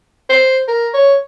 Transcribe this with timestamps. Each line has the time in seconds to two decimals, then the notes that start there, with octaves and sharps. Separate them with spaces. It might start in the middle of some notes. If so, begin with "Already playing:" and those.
0.29 C5
0.68 A#4
0.94 C#5